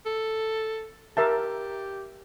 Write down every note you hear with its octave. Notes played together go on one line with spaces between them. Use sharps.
A4
G4 A#4 E5 A5